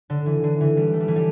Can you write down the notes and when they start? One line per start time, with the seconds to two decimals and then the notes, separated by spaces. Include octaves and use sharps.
0.10 D3
0.26 E3
0.43 D3
0.61 E3
0.77 G3
0.94 A3
1.00 G3
1.08 E3
1.16 G3